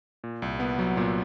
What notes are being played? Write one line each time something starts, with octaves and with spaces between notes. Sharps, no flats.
A#2
C2
B3
F#3
A#2